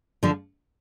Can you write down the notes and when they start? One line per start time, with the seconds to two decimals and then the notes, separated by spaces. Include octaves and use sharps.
0.23 D3 F3